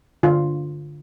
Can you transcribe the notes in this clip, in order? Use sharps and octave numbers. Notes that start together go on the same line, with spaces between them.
D3 F4